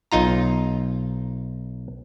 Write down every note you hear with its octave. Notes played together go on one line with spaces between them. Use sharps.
B1 D#4 F4 A#5